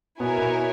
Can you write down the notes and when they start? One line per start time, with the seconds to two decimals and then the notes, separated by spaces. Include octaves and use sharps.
0.20 B2 B3 E4 A#4 C#5 G#5
0.38 B2 B3